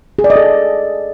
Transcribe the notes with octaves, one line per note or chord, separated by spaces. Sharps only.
G#4
D5
D#5
A4